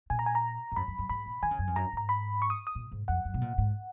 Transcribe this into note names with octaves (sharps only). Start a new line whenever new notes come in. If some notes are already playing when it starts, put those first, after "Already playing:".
A#2 G#5
A#5
G#5
A#5
G#2
F#2 B5
F#2
F#2
G#2 B5
A#2
D#3 G#5
C#3
F#2
F2
F#2 A#5
G#2 A#5
B5
C#6
D#6
D#6
A#2
G#2
F2 F#5
F#2
B2
A#2
G#2